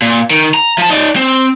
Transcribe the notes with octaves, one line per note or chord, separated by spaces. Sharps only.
A#2
D#3
A#5
F3 A5
D#4 D5
C4